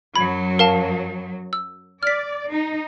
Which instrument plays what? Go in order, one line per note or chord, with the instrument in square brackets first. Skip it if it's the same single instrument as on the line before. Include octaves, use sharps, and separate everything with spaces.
[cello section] F#2 F#3 [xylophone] B5 G#6
[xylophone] A#4 F5 A5
E6
[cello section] D5 [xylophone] F6 B6
[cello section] D#4